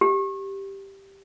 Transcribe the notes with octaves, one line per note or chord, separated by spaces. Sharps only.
G4